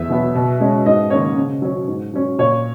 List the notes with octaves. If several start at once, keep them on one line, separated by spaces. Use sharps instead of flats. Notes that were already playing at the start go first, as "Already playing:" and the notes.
Already playing: E2 E5
B2 F#3 B3
B2
G#3 C#4
G#2 D#5
D#3 A#3 C#4 C#5
C#3
F#3 C#4
G#2
F#3 C#4
A#2 C#5